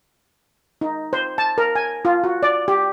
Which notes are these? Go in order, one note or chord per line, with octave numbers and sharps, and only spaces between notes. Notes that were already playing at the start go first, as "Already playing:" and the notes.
D#4
C5
A5
A#4
G#5
F4
F#4
D5
G4